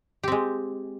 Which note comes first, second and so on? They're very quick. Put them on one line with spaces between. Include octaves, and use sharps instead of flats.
G4 C4 G#3